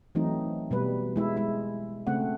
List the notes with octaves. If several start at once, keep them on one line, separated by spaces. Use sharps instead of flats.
E3 F#3 A3 C4 D#4
B2 G3 B4
G#3 E4 E5
G#3 E4
C#3 A3 C4 F#5